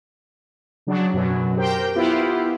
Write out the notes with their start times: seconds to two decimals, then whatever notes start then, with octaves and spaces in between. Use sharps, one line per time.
0.87 C#3 F#3 D4
1.13 F#2 B2 F#3
1.57 G4 A#4 C5 G5
1.95 B3 E4 F4 G4